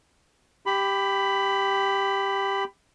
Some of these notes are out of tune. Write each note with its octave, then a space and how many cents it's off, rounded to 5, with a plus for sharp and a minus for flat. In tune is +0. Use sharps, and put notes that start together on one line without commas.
G4 +0 B5 +15